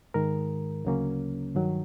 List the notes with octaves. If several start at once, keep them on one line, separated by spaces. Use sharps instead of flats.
G#2 D#3 G#3 A#4
D2 C#3 F#3 A#3 C#4
G2 D#3 F#3